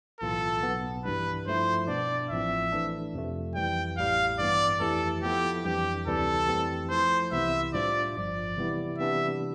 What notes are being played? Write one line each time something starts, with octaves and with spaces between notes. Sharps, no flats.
B1 A2 E3 B3 F4 A4
B1 B2 B3
G2 E3 G3 D4 B4
G2 F3 A3 E4 C5
B2 B3 D4 D5
A1 A2 F3 C4 E5
E3 A3 D4
F2 C3 F3 A3
F2 E3 G3 G5
A1 A2 G3 F5
G2 E3 B3 D5
F2 E3 A3 E4 G4 A4
F3 B3 E4 G4 A4
F2 E3 G3 D4 G4
D2 C3 E3 G3 C4 A4
F2 E3 A3 C4 G4
F3 A3 E4 C5
C2 C3 E3 B3 E4 E5
A2 G3 D4 F4 C5 D5
G1 G2 F3 D5
C3 E3 G3 B3 E4
C3 E3 G3 B3 D4 E5